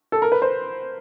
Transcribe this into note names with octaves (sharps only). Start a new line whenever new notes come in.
A4
A#4
B4
C5